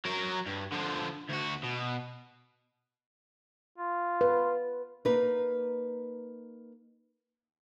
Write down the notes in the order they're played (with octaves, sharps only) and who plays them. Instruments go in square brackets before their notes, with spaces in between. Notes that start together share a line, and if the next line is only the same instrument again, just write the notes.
[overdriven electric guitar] F#3 A#4
G2
D3 F3
D2 F#4
B2
[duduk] F4
[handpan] B4
[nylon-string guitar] A#3 D#4 B4